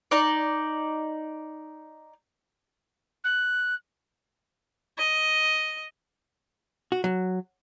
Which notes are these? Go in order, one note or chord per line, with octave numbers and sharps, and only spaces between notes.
D#4 D5
F#6
D#5
F#4
F#3